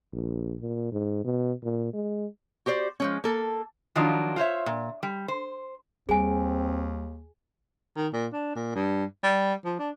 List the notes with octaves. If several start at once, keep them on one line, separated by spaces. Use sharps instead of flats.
A#1
A#2
G#2
B2
A#2
G#3
F#4 G4 C5 D5
F3 G#3 C#4
A#3 A4
D#3 F3 F#3 D4 D#4 F4
F4 C5 C#5 E5
A#2
G3
C5
D#2 G3 C4 G#4 G#5
D#3
A#2
D4
A#2
G2
G3
F3
D4